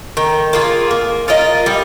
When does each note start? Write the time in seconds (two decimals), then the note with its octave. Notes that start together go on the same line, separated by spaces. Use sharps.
0.17 D#3
0.53 A#3 F4 G#4
0.91 A#3
1.28 F4 A#4 D#5
1.66 G3